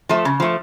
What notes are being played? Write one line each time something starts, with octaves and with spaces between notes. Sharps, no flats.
F3 A3
C#3
F3 A3